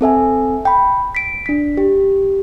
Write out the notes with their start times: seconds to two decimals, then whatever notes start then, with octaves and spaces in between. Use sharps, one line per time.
0.01 C4 A4 E5 G#5
0.65 G5 B5
1.15 B6 D7
1.46 D4 B6
1.77 G4